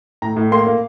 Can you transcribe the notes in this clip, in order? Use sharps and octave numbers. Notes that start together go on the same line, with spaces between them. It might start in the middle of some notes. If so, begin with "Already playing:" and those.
A2 A#5
A2
A#3 C6
A#3